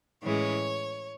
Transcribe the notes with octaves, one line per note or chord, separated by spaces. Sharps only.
A2 E3 G#3 C#4 C#5